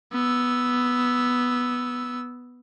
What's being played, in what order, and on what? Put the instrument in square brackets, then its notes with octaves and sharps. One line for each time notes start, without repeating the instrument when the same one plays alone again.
[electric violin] B3 E6